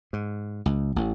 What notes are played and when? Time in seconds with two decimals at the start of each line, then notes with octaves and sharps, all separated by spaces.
0.13 G#2
0.66 C#2
0.96 A1